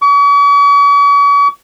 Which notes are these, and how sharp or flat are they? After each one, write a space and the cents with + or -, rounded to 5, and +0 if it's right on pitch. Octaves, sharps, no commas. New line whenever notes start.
C#6 +45